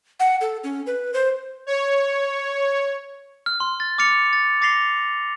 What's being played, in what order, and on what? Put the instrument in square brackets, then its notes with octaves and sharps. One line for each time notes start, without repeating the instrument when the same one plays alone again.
[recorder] F#5
A4
C#4
B4
C5
[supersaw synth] C#5
[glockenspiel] F6
C6
F6 A6
D6 F6 A6 C#7 F7
A6
D6 A6 A#6 C7 F7 G7